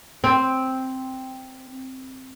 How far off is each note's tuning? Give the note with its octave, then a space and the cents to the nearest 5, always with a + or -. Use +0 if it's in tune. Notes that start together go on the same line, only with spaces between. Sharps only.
C4 +0